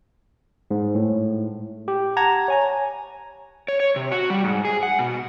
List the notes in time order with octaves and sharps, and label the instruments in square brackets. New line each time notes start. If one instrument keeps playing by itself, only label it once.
[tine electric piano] G#2
A2
G4
F#5 A5 A#5 G#6
C#5 G#5 A#5
[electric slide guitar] C#5
C#5
C3
F#4
G3
G#2
G#4
F#5
B2